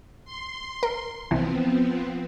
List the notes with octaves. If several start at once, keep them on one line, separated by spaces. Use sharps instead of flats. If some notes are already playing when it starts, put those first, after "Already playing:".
C6
A#4
C2 E3 F3 B3 C4